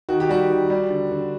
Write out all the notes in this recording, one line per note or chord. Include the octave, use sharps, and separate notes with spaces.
D#3 F#4
G4
G3 F#4
D#3
G3
D3
D3